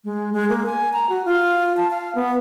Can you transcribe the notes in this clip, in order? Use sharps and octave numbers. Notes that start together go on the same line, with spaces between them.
G#3
G#3
A#3
G#5
A#5
F#4
F4
A5
F5
B3